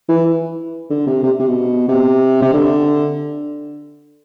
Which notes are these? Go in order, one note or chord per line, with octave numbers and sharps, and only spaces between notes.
E3
D3
C3
C3
C3
B2
C3
C3
D3